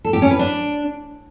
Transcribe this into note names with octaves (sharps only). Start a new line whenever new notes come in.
A4
G4
C#4
B4
D4